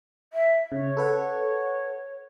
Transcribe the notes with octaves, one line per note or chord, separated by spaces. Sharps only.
E5
C#3 C#5
A4 B4 F#5